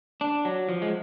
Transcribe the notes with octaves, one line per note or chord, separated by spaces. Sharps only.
D4
F#3
F3
G#3